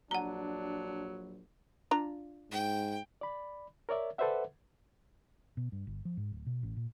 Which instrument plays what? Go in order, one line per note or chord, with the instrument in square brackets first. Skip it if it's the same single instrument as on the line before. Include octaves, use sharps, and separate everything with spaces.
[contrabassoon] A#1 [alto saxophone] F#3 [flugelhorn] D4 [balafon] F#5 A#5
[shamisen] D4 F4 A#5
[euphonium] G#2 [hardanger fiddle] G5
[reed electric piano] D5 B5
A#4 C#5 D5 E5
A4 B4 C5 D5 E5 F#5
[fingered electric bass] B2
G2
G1
F3
G#2
D1
B2
A1
A#2